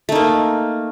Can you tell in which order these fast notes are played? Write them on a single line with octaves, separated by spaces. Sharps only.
A3 D#4 A#3